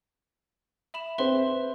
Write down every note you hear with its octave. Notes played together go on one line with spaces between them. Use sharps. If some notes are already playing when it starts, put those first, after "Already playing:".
E5 B5 E7
C4 B4 C5 E5 C6